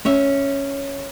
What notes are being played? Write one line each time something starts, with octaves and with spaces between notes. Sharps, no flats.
C#4 C#5 E5